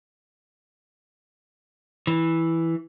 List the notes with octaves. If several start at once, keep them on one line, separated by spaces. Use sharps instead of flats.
E3